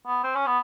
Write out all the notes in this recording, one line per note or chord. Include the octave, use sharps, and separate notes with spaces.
B3
C4
C#4
B3